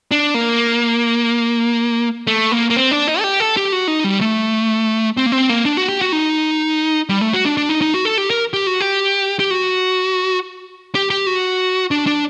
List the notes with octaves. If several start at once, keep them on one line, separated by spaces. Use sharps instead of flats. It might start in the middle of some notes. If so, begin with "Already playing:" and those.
D4
A#3
A3
A#3
A#3
C4
D4
D#4
A4
G4
A4
G4
F#4
D#4
G3
A3
C4
A#3
C4
A#3
D4
F#4
G4
F#4
D#4
G3
A3
F#4
D4
D4
D#4
D#4
F#4
A4
G4
A#4
G4
F#4
G4
G4
F#4
G4
G4
F#4
D4
D4